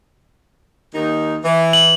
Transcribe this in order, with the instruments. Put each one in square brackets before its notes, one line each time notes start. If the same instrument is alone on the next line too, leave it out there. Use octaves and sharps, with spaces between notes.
[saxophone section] D#2 D#4
E3
[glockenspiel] F#7